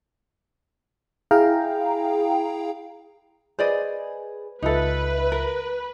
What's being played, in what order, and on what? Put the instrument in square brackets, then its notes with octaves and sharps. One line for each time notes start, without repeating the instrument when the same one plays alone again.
[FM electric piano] E4 G#4 F5 G5 A#5
[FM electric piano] G#4 B4 G#5 [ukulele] C5 D5 D#5
[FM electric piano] C#2 F4 E5 [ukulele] D#4 A4 [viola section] B4
[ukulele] A#4